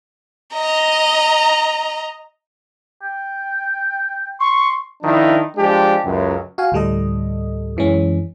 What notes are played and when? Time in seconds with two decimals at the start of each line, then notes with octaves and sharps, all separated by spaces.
0.54 D#5 A#5
3.03 G5
4.40 C6 C#6
5.03 D#3 F3 D4 E4
5.57 F3 G#3 D4 G4
6.04 C#2 F#2
6.58 F#4 F5 G#5
6.72 D2 A2 G3 A4 D#5
7.77 F#2 E3 G#3 C#4